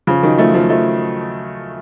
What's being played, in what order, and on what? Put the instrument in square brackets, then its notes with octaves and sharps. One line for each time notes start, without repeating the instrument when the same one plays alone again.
[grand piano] C#3 F3
D#3 F#3
F3 A3
F3 A3
F3 A3